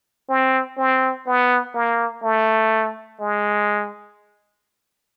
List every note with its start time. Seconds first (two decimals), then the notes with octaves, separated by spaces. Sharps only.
0.29 C4
0.78 C4
1.26 B3
1.74 A#3
2.23 A3
3.20 G#3